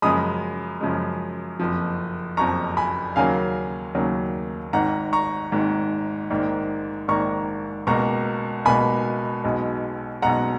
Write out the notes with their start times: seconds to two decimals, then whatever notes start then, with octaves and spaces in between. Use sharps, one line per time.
0.02 F#2 C#3 F3 G#3 B5 D#6
0.81 F#2 C#3 F3 G#3
1.60 F#1 F2 F3
2.37 F#1 F2 F3 A#5 C#6
2.77 G#5 B5
3.16 D#2 C#3 F#3 A#3 F5 G#5
3.95 D#2 C#3 F#3 A#3
4.73 G#1 G#2 D#3 F#5 A#5
5.13 A#5 C#6
5.52 G#1 G#2 D#3
6.31 A#1 G#2 D#3 A#3
7.08 A#1 G#2 D#3 A#3 A#5 C#6
7.87 C#2 B2 A#3 A#5 C#6
8.65 C#2 B2 A#3 G#5 B5
9.44 B1 B2 G#3
10.22 B1 B2 G#3 F#5 A#5